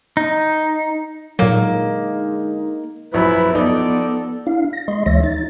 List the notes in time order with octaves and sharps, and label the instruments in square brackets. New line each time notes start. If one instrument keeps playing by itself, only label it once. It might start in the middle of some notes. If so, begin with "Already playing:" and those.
[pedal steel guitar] D#4
[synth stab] A#2 F#3 [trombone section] D3 G#3 D#4 [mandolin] A#3
[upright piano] A#1 F#2 [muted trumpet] E4 [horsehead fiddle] B4
[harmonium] F3 D5 [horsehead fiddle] B3 [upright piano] D#4 [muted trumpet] A4
[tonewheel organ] D4 E4 F5
A#6
G#3 D#5 C6
D2 E3 G#3 C#5 E5 A#6
D#4 A6